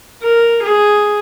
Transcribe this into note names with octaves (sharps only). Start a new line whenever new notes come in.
A#4
G#4